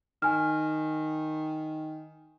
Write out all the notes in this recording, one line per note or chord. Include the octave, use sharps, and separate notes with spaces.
D#3 G#5 F6